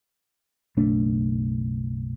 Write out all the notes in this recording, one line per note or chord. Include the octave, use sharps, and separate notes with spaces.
F#1 B1 A3 D4